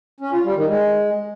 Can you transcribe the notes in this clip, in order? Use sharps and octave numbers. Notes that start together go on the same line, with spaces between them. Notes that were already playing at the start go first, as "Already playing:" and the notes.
C#4
F4
G3
D#3
G#3